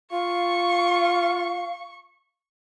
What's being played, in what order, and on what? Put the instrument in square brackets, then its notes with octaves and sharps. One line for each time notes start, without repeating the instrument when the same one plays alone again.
[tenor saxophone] F4 [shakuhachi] F5 [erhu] C#6